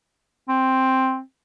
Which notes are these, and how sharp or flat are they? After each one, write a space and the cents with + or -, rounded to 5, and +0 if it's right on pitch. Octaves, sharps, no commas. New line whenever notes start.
C4 +5